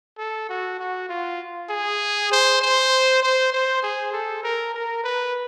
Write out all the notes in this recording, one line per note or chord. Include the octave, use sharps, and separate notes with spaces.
A4
F#4
F#4
F4
G#4
C5
C5
C5
C5
G#4
A4
A#4
A#4
B4